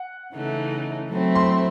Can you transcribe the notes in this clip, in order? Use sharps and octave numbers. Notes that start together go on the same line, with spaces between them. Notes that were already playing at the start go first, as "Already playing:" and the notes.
Already playing: F#5
C#3 E3 A3 D#4
F#3 A3 C4 E4
C6